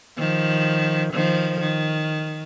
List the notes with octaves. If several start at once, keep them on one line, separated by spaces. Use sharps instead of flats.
D#3 F3
D#3 F3
D#3